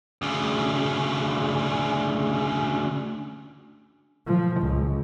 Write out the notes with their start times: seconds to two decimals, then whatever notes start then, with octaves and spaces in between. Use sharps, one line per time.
0.22 D2 C#3
4.27 F3
4.61 C#2